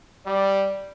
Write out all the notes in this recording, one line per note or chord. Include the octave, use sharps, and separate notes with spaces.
G3 D5